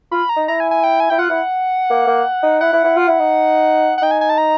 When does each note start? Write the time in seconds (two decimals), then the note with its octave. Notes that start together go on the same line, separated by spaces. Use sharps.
0.12 F4 B5
0.29 A#5
0.36 D#4
0.48 E4 A#5
0.60 G#5
0.71 G#5
0.84 G5
1.00 G#5
1.10 E4 G5
1.19 F4 F#5
1.30 E4
1.90 A#3
2.07 A#3
2.43 D#4
2.61 E4 F#5
2.73 E4
2.84 E4
2.97 F4
3.08 E4
3.19 D#4
3.98 F#5
4.02 D#4 G5
4.11 G#5
4.21 G#5
4.30 A5
4.38 A#5